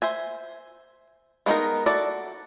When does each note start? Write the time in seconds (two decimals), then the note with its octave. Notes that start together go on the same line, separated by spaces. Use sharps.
0.02 C5 E5 G#5
1.46 G#3 B3 C#4 D#4 A#4
1.86 E4 F#4 A4 D5